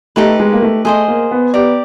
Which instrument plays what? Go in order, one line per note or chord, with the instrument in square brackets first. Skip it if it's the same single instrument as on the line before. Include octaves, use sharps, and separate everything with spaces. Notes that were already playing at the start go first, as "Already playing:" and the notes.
[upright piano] A3 [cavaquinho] D#4 G4 B4
[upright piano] G#3
A#3
A3
[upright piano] A3 [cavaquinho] G#4 C5 D#5
[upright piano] A#3
B3
[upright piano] B3 [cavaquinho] G4 A#4 D5